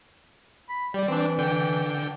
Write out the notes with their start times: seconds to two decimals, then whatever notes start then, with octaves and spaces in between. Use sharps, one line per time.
0.69 B5
0.94 G3 D5
1.08 E3 C4 D4
1.38 D3 G5